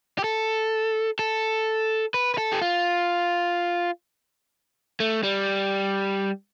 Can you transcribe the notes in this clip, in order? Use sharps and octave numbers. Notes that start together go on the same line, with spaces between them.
G4
A4
A4
B4
B4
A4
G4
F4
A3
G3